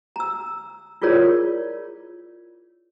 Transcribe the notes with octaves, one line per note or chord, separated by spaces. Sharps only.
A#5 E6
E4 F4 G#4 A#4 C#5 D5